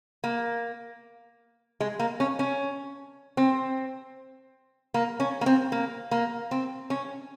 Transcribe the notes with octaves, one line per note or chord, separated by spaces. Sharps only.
A#3
G#3
A#3
C#4
C#4
C4
A#3
C#4
A#3
C4
A#3
A#3
C4
C#4